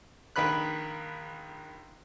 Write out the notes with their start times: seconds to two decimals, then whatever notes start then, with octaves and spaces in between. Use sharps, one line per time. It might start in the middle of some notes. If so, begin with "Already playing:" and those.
0.36 A#1 D#3 B4 B5 F#6